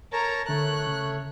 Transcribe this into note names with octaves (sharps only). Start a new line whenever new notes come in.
A#4 C#5 A5 A#5
D3 A3 C#5 F#6
C#3